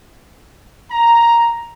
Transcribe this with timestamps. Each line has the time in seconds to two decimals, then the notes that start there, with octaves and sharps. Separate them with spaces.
0.92 A#5